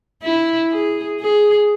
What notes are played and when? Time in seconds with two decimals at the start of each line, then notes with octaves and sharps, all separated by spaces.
0.23 E4
0.72 G#4
1.21 G#4